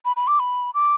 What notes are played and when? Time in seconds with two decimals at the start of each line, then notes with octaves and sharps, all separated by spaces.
0.05 B5
0.16 B5
0.27 D6
0.40 B5
0.74 D6